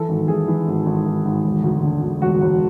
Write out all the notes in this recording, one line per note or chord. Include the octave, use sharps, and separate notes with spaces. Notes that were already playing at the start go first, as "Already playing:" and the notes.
Already playing: E3 A4
G#1
E3 G#4
E3
G#1
G#1
G#1
G#1
E1
D2
D3
D2
E1 F#4
E1